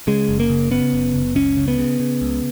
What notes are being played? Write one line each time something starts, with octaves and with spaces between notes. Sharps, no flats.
C#3 G#3
F#1
A#3
C#3
C#3 B3
F#1
F#1
C#2 C#4
C#3
B3
C#3
C#3
C#2